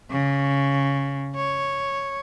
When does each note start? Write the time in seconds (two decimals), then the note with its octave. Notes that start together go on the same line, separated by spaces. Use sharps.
0.11 C#3
1.35 C#5